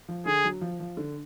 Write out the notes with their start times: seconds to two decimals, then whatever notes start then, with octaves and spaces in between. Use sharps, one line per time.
0.08 F3
0.26 D3 G#4
0.45 F#3
0.61 F3
0.80 F3
0.97 D3